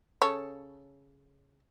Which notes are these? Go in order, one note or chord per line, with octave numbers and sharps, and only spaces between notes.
C#3 A4 C#5